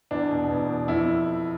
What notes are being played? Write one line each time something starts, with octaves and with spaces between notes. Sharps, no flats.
E2 D4
B2
E2
B2
F2 E4